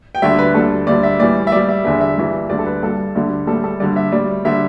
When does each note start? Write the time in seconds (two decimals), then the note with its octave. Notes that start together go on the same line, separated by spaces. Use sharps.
0.15 G5
0.22 D2 D3 G3 E5
0.38 B4
0.54 D2 D3 G3 A4
0.87 D2 D3 G3 D5
1.03 E5
1.19 A2 E3 G3 D5
1.47 E5
1.52 A2 G3 D5
1.69 E5
1.85 E2 D3 G3 E5
2.01 E5
2.17 G2 E3 G3
2.50 D2 D3 G3 D5
2.59 A4
2.66 B4
2.83 G2 G3 A4
3.15 D2 D3 G3
3.47 A2 G3 A4
3.64 A4
3.80 G2 D3 G3 D5
3.96 E5
4.12 A2 G3 D5
4.45 D3 G3 E5